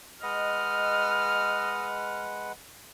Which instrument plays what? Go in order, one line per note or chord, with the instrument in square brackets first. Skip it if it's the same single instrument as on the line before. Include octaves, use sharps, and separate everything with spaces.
[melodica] G#3 B4 F#5 [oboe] D#5 [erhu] F6